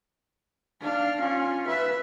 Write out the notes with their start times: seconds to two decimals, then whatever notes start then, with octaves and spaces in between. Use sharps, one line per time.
0.81 D4 F5
1.19 C#4 F4
1.67 B4 E5